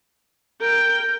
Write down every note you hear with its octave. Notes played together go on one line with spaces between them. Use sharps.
A#4 G5